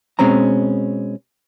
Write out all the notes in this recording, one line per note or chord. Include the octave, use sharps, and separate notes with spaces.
B2 G#3 C4 C#4 A#5